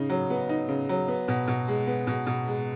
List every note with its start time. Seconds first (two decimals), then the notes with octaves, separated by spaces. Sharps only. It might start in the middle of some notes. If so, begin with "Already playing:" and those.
Already playing: C#3 D#4
0.10 F#3
0.30 B3
0.49 D#4
0.69 C#3
0.89 F#3
1.08 B3
1.28 B2
1.48 B2
1.68 G#3
1.87 B3
2.07 B2
2.27 B2
2.48 G#3